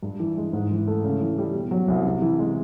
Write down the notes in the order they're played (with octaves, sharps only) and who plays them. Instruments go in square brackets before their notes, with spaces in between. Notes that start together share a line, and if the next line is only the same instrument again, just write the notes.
[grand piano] G2
E3
G#3
G#2
E3
A3
C#3
E3
G3
B2
F#3
C2
C3
E3
G#3